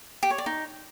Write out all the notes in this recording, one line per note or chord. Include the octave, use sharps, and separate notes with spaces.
G4
C#5
D5
D#4